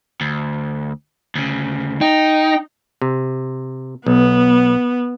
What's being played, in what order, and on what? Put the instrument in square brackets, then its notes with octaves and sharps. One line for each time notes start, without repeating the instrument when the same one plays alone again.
[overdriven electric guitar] D2
D2 C#3
[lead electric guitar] D#4 [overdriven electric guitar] G5
[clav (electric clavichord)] C3
[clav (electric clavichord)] B1 [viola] B3